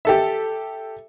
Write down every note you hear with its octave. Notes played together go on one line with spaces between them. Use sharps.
G4 A4 E5